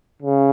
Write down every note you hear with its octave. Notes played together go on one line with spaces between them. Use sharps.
C#3